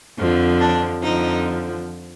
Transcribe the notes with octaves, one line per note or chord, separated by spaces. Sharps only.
F2 D3 F3
D4
F2 D3 F3 D#4